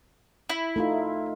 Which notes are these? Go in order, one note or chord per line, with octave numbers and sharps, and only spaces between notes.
E4
A3 D#4 F4